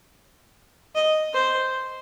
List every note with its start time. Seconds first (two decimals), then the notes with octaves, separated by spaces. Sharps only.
0.95 D#5
1.34 C5